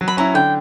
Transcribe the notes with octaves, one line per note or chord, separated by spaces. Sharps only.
F#3
B5
C#4 E4 A#5
D3 G5